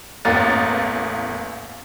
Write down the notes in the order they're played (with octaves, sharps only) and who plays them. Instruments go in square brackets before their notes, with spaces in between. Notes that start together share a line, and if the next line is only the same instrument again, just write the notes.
[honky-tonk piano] A1 E2 A#3 A#5 A6 D#7